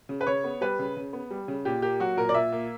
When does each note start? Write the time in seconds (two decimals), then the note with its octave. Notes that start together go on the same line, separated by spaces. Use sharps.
0.09 C#3
0.21 B4
0.27 C#3 C#5
0.44 B3
0.61 G3 B4
0.79 C#3
0.97 C#3
1.13 B3
1.31 G3
1.48 C#3
1.65 A#2 G4
1.82 A#3 G4
2.00 F#3 F#4
2.17 A#2 A#4
2.29 D5
2.34 A#2 E5
2.52 A#3